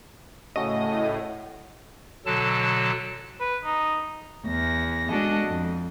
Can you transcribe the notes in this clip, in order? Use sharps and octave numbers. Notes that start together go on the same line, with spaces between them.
A2 C#3 A3 F#4 D#5
B2 D3 F#3 A4 A5
B4
D#4
E2 A#6
G#3 D4 F#4 A4 D#5
F2